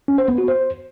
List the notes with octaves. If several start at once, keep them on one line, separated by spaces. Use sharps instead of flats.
C#4
C5
B3
F#4
C5